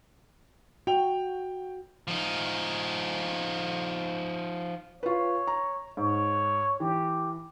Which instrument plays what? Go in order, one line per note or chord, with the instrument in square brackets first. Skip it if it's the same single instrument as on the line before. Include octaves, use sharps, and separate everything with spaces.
[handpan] F#4 [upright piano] G5 F7
[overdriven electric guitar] F3 D#4
[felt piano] F4 B4 [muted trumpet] C#5
[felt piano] A#5
[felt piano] G#2 [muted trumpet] C#5
[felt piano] E3 [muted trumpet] G4